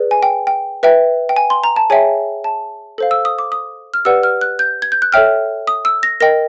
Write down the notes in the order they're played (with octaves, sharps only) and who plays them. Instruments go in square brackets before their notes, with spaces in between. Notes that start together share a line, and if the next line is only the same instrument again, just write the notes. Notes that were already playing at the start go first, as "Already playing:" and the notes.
Already playing: [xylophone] G#4 B4 D5
G#5
G5
G5
B4 E5 G5
G5
G#5
C6
A#5
A5
G#4 C#5 E5 G5 G#5
A5
A4 C5 F5
E6
D#6
D6
D#6
F6
G4 B4 D5 F#5 E6
F6
F#6
G6
G#6
G6
F#6
A4 C#5 E5 G5 F6
D#6
E6
A#6
A#4 D#5 G5 A#6